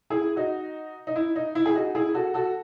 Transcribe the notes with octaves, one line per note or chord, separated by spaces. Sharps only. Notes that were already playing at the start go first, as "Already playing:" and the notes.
E4 G#4
D#4 F#4
D#4
E4
D#4
E4
G#4
D#4 F#4
E4 G#4
F#4 A4
F#4 A4